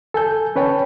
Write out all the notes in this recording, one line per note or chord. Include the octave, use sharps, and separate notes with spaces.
A4 G#5 G6
C#4 B4 C#5 G5 A5